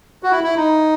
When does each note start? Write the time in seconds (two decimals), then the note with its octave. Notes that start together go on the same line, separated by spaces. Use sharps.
0.23 F#4
0.31 E4
0.44 E4
0.57 D#4